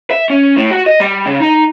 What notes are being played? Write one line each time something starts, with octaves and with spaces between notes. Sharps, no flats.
E5
C#4
A2
F#4
D#5
G3
C#3
D#4